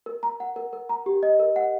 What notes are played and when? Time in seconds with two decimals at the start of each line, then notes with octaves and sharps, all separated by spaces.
0.06 A#4
0.23 A#5
0.40 F#5
0.56 A#4
0.73 A#4
0.89 A#5
1.06 G4
1.23 D#5
1.39 A#4
1.56 F#5